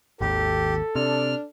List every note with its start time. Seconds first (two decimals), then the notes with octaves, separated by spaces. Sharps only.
0.21 G#1 D#2 G4 A4
0.96 C3 D4 F6